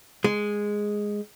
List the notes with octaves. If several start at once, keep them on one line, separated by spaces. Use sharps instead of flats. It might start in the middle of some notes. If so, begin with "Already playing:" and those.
G#3